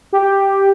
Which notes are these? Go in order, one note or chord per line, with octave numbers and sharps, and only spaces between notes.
G4